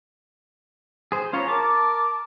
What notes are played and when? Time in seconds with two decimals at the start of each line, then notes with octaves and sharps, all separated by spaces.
1.12 G#4 C5
1.33 B2 C#4 F4 C#5 A#5 B5
1.48 A#4 A5 D6